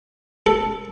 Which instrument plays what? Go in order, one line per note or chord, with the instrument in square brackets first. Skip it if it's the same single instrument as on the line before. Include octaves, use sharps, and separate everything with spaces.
[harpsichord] A4